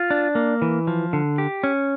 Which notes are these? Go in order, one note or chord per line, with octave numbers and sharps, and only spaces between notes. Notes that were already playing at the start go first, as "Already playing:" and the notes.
Already playing: F4
D4
A#3
E3
F3
D3
G4
C#4